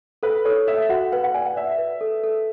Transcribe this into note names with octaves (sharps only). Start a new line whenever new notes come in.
A4 B4
A4 C#5
A4 E5
F#4 F#5
B4 F#5
F#5
D5 G#5
F#5
D5 E5
B4
A4
A4